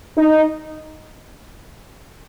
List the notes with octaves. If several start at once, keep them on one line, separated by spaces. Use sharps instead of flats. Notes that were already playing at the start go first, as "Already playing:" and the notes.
D#4